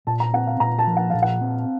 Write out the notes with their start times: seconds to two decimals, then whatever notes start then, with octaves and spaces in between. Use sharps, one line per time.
0.07 A#2 A5
0.20 A#5
0.33 C4 F#5
0.47 F5
0.60 A#2 A#5
0.79 A5
0.87 F3
0.97 F#5
1.10 A#2 F5
1.22 F#5
1.41 C4